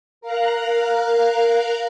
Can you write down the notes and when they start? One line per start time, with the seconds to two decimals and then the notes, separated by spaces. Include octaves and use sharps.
0.21 A#4 F5 A#5 F#6